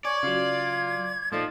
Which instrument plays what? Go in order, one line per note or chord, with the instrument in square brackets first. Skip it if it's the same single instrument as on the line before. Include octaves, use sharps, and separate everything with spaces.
[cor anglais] C#5 [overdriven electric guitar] D5 [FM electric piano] G#5 [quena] G#6
[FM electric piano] C#3 F#3 [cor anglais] F4
[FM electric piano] A#2 A3 D#4 [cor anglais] F3 [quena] D5